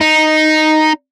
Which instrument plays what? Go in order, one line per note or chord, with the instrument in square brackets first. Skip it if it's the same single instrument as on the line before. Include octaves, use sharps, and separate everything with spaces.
[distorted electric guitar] D#4